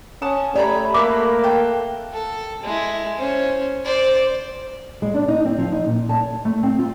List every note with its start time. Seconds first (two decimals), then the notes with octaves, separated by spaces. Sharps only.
0.22 C#4 F#5 A5 D#6
0.56 A3 G4 C#5 D5 A#5 B5
0.94 A#3 E4 F#4 B5 D6
1.44 A4 G5 F#6
2.13 A4
2.63 G#3 E4
3.19 C#4 C5
3.85 C5 D5
5.02 G#3
5.14 D4
5.28 D#4
5.45 C4
5.58 F3
5.72 D#4
5.86 A#2
6.09 A5
6.21 C#5
6.45 A3
6.63 C4
6.79 F4